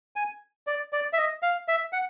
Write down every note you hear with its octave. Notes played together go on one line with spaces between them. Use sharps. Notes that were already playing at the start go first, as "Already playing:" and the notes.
G#5
D5
D5
E5
D#5
F5
E5
F#5